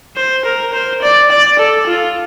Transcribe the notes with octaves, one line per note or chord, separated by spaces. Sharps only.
C5
A#4
C5
D5
D5
A4
F4